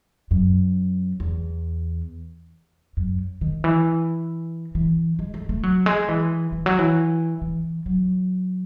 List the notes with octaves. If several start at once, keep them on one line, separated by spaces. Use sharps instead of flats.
F#2
E2
F#2
D#3
E3
E3
G#3
A3
A3
F#3
G#3
E3
E3
F#3
E3
E3
F#3